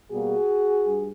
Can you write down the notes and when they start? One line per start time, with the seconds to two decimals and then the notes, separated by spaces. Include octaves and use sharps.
0.11 B2 G3 A#3 F#4 G#4
0.84 G2